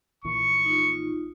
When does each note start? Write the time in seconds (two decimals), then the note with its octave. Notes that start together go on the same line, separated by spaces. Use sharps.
0.24 A#1 A#2 E3 C#6
0.66 D#4 F4